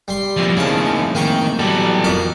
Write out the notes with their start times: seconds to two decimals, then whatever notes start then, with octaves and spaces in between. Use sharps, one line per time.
0.08 G3 C6
0.37 F2 A2 F3 A#3
0.57 C#3 F3 A#3 D#4 A5
1.15 D#3 A#3 G5 C#6
1.59 B2 E3 F#3 G3 A4
2.04 F2 A#4